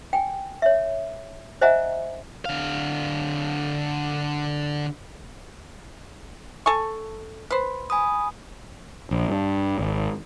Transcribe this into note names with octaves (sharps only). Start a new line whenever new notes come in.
G5 G#5
C#5 E5
C5 D#5 E5 F#5 G#5 A#5
D3 F5
A4 G#5 C#6
B4 C5
G#5 B5 D#6
A#1
G2
G#1